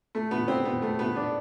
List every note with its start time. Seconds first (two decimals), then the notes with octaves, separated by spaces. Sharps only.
0.15 A3
0.31 B3
0.48 C4
0.65 B3
0.82 A3
0.99 B3
1.16 D4